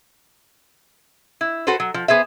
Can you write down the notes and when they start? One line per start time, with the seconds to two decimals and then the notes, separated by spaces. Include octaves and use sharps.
1.41 E4
1.67 F#4 A4 B4 C5
1.80 F#3
1.94 F3
2.08 B3 G#4 C5 E5